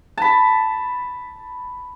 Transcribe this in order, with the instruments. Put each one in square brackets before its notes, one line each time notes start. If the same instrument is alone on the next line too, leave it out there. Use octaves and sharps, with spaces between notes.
[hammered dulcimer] A5 B5